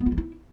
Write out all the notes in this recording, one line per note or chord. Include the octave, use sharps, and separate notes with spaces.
B3
F4
E3
E4